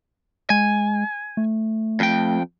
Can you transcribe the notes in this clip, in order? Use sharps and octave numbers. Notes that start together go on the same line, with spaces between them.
G#3 G#5
A3
F2 G5